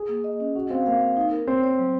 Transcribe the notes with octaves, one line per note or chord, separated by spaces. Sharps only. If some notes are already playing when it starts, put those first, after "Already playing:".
Already playing: G#4
A#3
D#5
C#4
C#4 F#4
C4 F5
A#3 F5
F5
D#4
A#4
C4 C#5
C#5
F#3